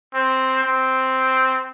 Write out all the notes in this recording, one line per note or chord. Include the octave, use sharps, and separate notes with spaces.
C4
C4